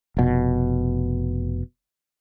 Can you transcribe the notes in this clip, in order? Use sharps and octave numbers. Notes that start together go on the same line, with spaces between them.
F1 B2